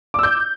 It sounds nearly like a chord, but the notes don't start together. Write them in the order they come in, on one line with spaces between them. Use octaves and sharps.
D6 E6 G6